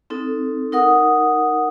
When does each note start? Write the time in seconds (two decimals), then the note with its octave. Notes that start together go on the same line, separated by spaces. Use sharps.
0.10 C4 D#4 A4
0.72 D#4 A#4 F#5 D#6